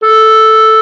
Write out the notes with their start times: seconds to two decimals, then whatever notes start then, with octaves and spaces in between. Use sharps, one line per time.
0.03 A4